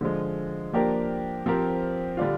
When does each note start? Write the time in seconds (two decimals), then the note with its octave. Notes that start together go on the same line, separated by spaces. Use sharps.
0.01 D3 F3 G#3
0.73 F3 A#3 D4 G4 A#4
1.46 F3 C4 G4 A#4
2.17 D3 G3 D4 F4